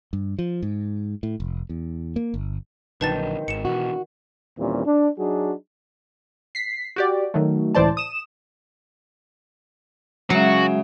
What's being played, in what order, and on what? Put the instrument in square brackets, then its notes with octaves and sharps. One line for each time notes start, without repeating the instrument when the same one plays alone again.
[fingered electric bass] G2
F3
G#2
A2
F1
E2
A#3
G1
[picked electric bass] A#1 D3 F#3 [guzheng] D#3 C5 [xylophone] B4 A5 A6
[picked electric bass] G#1 [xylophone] C#7 E7
[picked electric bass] B2 E3 [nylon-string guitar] F#4
[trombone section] D#2 A#2 E3 G3 C4 C#4
D4
F#3 D4 D#4 F#4 G#4
[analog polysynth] B6 C7
F#4 G4 D5
D#3 F#3 A3
C#2 A2 E3 C5 D5 A5
D#6 E7
[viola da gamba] C#3 [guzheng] F#3 [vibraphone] G#3 E5 [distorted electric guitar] F#4